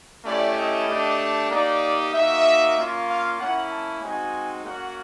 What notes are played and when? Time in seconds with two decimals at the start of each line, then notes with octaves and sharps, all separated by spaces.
0.25 A3 C#4 E4 G4 D5
0.56 D#5
0.89 A3 D4 G4
1.51 A#3 D#4 G4 D5
2.13 A#3 D#4 F#4 E5
2.77 A#3 C#4 F4
3.09 F5
3.40 A#3 C#4 E4 F#5
3.71 A5
4.02 G#3 C4 D#4 F#4 G#5
4.65 A#3 C#4 F#4 F#5